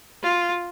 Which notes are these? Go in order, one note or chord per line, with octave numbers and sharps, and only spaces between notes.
F4